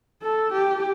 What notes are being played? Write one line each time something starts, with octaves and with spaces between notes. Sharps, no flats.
A4
G4